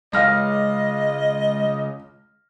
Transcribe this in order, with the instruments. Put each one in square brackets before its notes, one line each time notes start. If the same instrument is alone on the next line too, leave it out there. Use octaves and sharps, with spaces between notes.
[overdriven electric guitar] C#2 [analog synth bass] G#3 [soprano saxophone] D#5 [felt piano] F5 F6 A#6